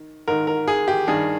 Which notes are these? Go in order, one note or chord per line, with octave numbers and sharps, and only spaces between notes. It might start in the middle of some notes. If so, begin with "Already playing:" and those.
Already playing: D#3
G#2 D#3 A#4
A#4
G#4
G4
G2 D#3 G#4